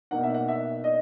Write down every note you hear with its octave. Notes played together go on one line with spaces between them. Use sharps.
B2 A#3 D#4 F#5
E5
F#5
E5
D#5